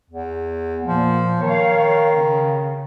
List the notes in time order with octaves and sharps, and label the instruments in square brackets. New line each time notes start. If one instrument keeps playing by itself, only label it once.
[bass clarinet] E2
[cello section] A#2 [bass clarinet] F3
[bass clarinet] D#3 [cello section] C#5 F5
[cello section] C#3